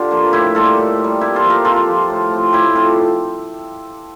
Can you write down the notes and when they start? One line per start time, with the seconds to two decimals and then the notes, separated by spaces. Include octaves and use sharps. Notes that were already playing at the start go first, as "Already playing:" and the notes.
Already playing: D3 F4 G4
0.11 F3 A#3
0.33 A2 E4 G4
0.55 G3 A#3 F4 A4
0.78 A2
0.99 G3 A#3
1.21 C3 E4 G4
1.36 F4 A4
1.44 F3 A#3
1.50 G4 A#4
1.65 C3 F4 A4
1.87 F3 A#3
2.10 A2
2.31 F3 C4
2.53 A2 E4 G4
2.75 F3 C4 F4 A4